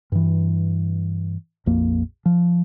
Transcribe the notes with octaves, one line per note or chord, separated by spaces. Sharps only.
G2 E3
A#1 F2 A#3
F3